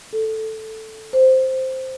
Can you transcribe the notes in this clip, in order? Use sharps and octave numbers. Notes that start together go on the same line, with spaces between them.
A4
C5